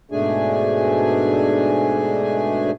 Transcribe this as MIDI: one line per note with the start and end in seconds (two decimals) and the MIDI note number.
0.11 2.71 44
0.11 2.71 47
0.11 2.71 57
0.11 2.71 62
0.11 2.71 68
0.11 2.71 80